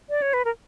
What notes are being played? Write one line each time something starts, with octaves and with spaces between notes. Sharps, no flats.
D5
C#5
B4
A#4